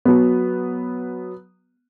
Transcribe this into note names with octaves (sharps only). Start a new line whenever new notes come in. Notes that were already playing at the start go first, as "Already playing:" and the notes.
F#3 B3